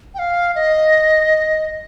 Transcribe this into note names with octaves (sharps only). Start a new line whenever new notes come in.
G5
F5
D#5